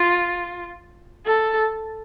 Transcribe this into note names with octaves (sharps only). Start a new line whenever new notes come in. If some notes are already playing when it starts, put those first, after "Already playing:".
Already playing: F4
A4